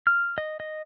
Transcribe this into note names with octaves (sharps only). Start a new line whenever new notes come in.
F6
D#5
D#5